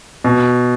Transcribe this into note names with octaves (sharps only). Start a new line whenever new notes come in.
B2